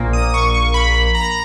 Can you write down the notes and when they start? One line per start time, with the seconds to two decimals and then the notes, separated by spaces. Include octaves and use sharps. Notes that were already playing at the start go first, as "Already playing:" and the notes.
Already playing: A#1 A#2 A#3
0.13 D#6
0.34 C#6
0.54 C#6
0.74 B5
1.15 A#5